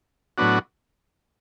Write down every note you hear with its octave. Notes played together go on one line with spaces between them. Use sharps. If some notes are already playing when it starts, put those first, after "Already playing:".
A2 F#3 B3 D4 F#4